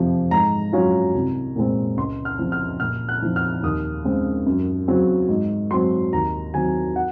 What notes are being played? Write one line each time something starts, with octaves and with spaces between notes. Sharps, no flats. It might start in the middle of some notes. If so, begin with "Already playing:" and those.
Already playing: F2 C3 F3
G#2 A#5
F#3 C#4 F4
C2
A#2 G#3 C4
C#2 C6
F6
C#3 F3 C4
F6
A#2 F6
F#6
F3 C4 D#4
F6
D#2 D#6
C#3 G#3 C4
F#2
C#3 F#3 C4
G#2
F#3 C4 C6
D#2 A#5
D#3 F#3 C4 G#5
F#5